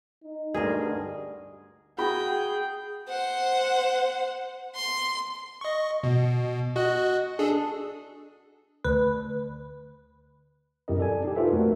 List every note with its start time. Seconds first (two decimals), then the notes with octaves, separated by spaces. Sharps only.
0.24 D#4
0.54 D2 G2 D3 G3 G#4 A#4 D#5
1.98 F#4 G#4 G5 B5
3.09 C5 F#5
4.76 C6
5.61 D#5 C#6
6.03 B2
6.76 F#4 D#5 F#6
7.39 D4 G#4 A4
8.84 D2 B4
10.88 F#2 C4 E4 G4 A#4 D#5
10.99 A4 D5 G#5
11.24 D#4 G4
11.36 F4 A4 B4 C5 E5
11.52 F2 A3 F#4 A#4